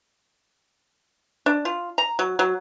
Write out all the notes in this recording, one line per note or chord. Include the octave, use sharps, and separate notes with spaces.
D4
F4
A#5
F#3
F#3